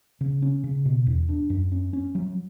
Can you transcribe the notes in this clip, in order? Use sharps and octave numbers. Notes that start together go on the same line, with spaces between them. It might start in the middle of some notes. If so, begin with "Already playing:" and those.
C#3
C#4
C#3
B2
E2
D4
F#2
C#4
C#4
F#3